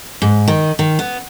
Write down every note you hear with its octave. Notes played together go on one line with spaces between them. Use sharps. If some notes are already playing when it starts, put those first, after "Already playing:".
G#2
D#3
D#3
B3